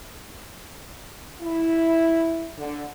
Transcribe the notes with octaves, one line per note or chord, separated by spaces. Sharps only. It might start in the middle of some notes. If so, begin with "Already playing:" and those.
E4
D3